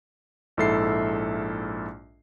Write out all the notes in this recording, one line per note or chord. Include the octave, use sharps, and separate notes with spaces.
A#1 G#2 E4 A4 E5 C7